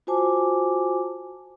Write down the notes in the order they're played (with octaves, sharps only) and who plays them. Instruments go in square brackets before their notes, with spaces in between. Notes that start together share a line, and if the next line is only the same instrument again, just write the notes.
[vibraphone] F4 F#4 C5 G#5 A5 D6